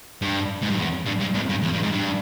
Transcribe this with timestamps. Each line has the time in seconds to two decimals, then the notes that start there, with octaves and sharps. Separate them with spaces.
0.22 G2
0.63 G#2
0.71 G2
0.78 E2
1.06 G2
1.20 G2
1.35 E2
1.49 G2
1.63 E2
1.72 G2
1.82 G#2
1.92 G2